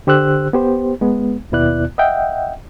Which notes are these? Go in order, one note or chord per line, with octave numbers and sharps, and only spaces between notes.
D3 G4 C5 E6 F#6
B3 G4 C5
G#3 B3
D#2 B2 B3 E4 D5 F#6
D#5 E5 F#5 G5